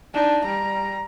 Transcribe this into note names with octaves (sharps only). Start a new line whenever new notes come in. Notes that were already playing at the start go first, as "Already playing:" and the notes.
D4 D#4
G3 A#5